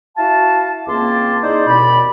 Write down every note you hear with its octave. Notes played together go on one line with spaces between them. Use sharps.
E4 F#4 F5 A5
C#2 A#3 C4 A5 C6 D6
D#4 E4 G#4 C5 D5
D#2 B2 C4 D5 B5